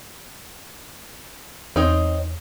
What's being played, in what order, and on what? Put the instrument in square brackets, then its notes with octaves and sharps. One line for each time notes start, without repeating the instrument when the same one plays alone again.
[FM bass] E2 [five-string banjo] C4 D#4 C#5